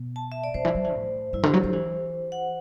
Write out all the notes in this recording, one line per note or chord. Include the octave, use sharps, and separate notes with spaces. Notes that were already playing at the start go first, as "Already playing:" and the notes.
Already playing: B2
A5
E5
D5
C3 C5
E3
F#3
E3
A2
G2 E4
D3 G4
F#3 A4
F#3 C5
E3
F#5